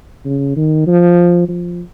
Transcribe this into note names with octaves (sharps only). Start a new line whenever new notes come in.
C#3
D#3
F3
F3